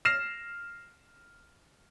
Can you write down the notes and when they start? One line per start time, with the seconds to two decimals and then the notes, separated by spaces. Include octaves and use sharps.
0.05 F6 A#6 C7 E7